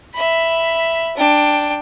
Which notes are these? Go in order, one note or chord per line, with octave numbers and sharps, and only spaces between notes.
E5 B5
D4 G5